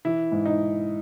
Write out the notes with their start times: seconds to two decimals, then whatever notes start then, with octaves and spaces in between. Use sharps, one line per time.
0.05 E3 E4
0.32 G#2
0.46 D#4